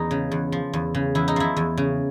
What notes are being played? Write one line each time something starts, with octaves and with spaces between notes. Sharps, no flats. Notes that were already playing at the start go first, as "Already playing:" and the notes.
Already playing: E2 D#4
C#3
E2
F3
E2
C#3
E2 E4
D#4
F3 E4
E2
C#3